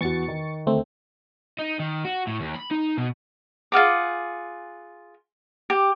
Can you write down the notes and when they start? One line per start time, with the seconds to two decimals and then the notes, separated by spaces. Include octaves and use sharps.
0.01 E2 F#4 C#6 A6 C#7
0.28 D#3
0.67 D2 A3 C4
1.59 D#4
1.79 D#3
2.05 F#4
2.27 A2
2.40 D#2
2.56 B5
2.71 D#4
2.97 B2
3.72 F4 G#4 F#5 D6
5.70 G4